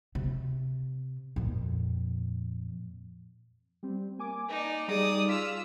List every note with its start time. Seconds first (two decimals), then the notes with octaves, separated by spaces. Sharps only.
0.15 C3
1.36 F2 A#2
3.83 G3 C4
4.19 A#3 G#5 D6
4.49 D#4 D5
4.88 G3 D#4 G#4 D5 D#6
5.28 F4 G#4 E6 B6